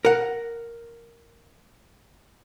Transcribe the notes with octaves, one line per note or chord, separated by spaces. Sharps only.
A#4 F#5